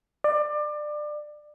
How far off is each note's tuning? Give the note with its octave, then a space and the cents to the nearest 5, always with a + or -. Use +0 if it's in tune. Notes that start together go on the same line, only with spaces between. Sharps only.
D5 +25